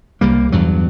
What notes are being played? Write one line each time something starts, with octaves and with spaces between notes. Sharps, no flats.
C2 G3 A#3
E2 G2 F#3